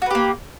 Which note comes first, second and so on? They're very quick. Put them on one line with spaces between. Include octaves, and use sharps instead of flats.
F#4 B4 G4 A#3